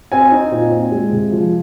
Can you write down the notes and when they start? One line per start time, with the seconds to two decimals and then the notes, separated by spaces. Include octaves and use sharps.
0.12 C4 G#5
0.32 D#4
0.51 A#2
0.71 C4
0.91 G#3
1.12 C3
1.32 F3